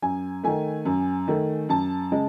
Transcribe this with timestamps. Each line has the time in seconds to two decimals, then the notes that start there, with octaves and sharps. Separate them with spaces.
0.02 F#2 G#5
0.44 D#3 A3 G#5
0.85 F#2
1.28 D#3 A3
1.69 F#2 A5
2.11 C#3 G#3